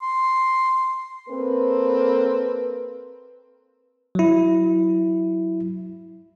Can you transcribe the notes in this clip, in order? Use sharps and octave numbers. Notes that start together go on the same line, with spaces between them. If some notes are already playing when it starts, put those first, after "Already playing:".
C6
A#3 C4 A4 B4
F#3 E4